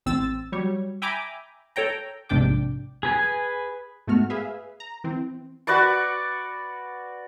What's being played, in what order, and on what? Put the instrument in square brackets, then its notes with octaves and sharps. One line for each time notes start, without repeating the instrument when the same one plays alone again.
[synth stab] A1 C4 E6 A6
F#3 G3 C#5
E5 G5 G#5 A#5 B5 D6
A4 C#5 G5 A#5
A#1 G#2 C3 D4 G5 D6
[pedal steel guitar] G#4 B4 G#5
[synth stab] G#2 A3 B3 F#4 F6
G#4 B4 E5 F5
A#5
E3 C4
[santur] F#4 B4 D5 C#6